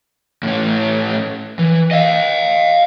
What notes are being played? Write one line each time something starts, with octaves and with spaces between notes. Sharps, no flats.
A2 C#4
E3
D#5 F5